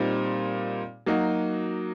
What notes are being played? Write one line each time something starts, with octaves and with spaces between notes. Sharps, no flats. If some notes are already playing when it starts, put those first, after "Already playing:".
Already playing: A#2 G3 C4 D#4
F#3 A#3 D#4 F#4